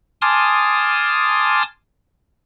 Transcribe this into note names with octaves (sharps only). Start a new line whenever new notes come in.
G#5 A5 C6 D6 D#6 F6